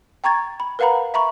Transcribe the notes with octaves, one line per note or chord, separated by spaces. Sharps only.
G5 A#5 C#6 G#6 A6
B5
A#4 B4 F5 F#5 A#5 B5
E5 A#5 B5 C#6